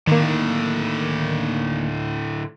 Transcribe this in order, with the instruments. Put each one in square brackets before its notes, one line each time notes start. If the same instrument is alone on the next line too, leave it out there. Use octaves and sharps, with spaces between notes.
[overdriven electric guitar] A2 D3 [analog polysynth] D#3 A#3